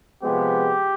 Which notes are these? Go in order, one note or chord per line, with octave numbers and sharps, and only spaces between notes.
C3 F3 G#3 B3 G4